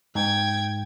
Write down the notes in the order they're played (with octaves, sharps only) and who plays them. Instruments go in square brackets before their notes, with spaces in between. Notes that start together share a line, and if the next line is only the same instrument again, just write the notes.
[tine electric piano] G#2 [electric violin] G5 G#6